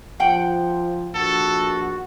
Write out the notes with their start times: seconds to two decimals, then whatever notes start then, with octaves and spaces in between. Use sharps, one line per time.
0.20 F3 F#5 G5
1.15 A#1 F#4 A4